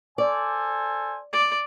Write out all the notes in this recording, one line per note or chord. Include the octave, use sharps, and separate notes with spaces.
A4 C5 D5 G#5
D5